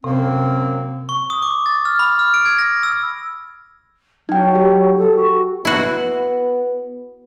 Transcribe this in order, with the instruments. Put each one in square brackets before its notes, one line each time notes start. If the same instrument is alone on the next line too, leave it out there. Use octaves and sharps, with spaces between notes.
[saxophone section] F#2 A#3 [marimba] C3 [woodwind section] C4
[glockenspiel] C#6
D#6
D6
A6
F6
B5
F6
D7
G#6
A#6
E6
[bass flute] F#3 [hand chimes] D#4 G5
[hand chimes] G4
[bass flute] A4
F#4
[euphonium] B3 [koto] E4 F#4